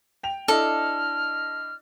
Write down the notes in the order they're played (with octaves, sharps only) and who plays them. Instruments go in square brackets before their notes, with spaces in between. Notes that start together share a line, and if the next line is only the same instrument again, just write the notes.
[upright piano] G5 F7
[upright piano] D4 E4 D#5 [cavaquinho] A4 [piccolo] F6